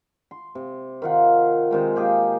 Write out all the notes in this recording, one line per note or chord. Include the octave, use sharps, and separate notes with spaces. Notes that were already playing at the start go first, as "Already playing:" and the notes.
C6
C3
D#3 F4 F#5
C3 D#3 G#3
A#3 G4 G#4